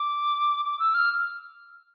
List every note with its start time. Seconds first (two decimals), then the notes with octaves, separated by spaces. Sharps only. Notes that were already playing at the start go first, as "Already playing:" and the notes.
Already playing: D6
0.65 D6
0.79 E6
0.94 F6